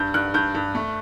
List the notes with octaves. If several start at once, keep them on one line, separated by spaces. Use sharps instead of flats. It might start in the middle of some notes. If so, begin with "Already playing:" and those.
Already playing: G2 G6
G2 F#6
G2 G6
G2
A3